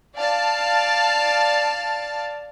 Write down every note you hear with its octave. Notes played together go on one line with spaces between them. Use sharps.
D5 F5 A5